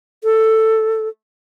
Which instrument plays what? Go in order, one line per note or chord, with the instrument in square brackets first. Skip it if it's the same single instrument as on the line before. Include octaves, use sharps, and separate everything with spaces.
[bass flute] A4